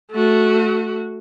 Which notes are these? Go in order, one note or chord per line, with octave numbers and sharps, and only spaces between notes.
A3 F#4